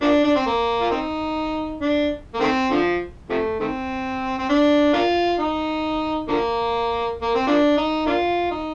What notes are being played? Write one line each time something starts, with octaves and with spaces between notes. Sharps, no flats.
F3 A#3 D4
D4
C4
A#3
F4
C4 D#4
D4
A#3
D#3 A3 C4
D3 F3
C3 F3 A3
D#3 A3 C4
C4
D4
A#3 D4 F4
D#4
D3 F3 A#3
A#3
C4
F3 A#3 D4
D#4
A#3 D4 F4
D#4